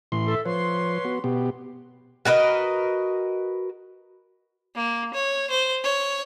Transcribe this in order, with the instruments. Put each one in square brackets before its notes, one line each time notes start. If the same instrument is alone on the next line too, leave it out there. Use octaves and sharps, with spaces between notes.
[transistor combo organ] A2 E3 C6
[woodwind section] A4 E5
[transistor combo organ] F3 [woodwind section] B4 C#5 C6
[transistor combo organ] B3 F#4
B2 B3 G4
[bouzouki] F#4 A#4 B4 D#5
[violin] A#3
C#5
C5
C#5